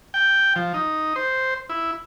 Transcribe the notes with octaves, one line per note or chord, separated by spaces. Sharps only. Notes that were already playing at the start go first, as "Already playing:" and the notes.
G5
F3
D#4
C5
E4